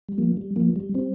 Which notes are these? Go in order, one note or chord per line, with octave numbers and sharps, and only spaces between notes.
G3
F3 A#3
G3
F3 A#3
G3
G3 C4